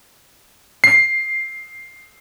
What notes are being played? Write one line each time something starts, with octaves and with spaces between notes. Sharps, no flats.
C7